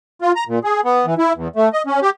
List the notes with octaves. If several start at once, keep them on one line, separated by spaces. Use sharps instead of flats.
F4
A#5
A#2
G#4
B3
E3
E4
E2
A3
D#5
C#4
G4